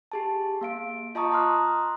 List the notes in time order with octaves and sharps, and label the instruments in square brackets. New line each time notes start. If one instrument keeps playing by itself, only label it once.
[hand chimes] G4 G#4 A5
A#3 F5 D7
F4 D#5 A5 A#5 C#6 D#6
A#5 C6 D#6 F6 F#6